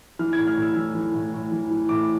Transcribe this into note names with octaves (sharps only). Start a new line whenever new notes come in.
E3 F6
G#6
A2
F6
A2
E6
E3
E3
A2
A2
E3
E3
A2 D6